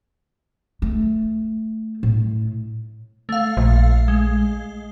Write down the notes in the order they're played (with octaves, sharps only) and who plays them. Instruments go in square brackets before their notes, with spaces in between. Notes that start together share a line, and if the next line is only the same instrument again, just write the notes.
[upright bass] A3
A2
[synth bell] A3 F5
[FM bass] A#1
[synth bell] G#3